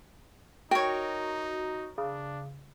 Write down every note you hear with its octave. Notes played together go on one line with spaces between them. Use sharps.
D#4 F#4 A#4 C#5 G5
C#3 D4